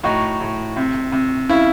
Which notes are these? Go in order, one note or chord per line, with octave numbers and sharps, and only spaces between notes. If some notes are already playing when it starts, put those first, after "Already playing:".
A2 D#4 F#4
A2
C3
C3
C#3 E4